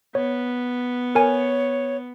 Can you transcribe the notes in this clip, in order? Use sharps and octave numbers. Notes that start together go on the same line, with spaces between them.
B3 C#5
A#4 C#5 G#5